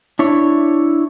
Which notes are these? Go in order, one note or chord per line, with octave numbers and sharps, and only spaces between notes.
D4 E4 C#5